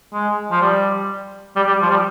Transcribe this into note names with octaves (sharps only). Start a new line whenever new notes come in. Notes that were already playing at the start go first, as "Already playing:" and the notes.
G#3
F3
G3
G3
G3
F3
G3